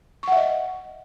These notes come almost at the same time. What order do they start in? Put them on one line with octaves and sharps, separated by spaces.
C#6 F#5 E5 D#5